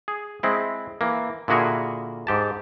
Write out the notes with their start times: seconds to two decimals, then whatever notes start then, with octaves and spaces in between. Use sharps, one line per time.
0.08 G#4
0.43 G#3 C4 E4
1.01 E3 A#3
1.48 A#2 D3 E4 F#4 G#4 A#4
2.27 G#2 G4 A5